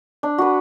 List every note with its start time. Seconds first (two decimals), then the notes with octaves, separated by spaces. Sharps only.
0.23 D4
0.38 F#4 B4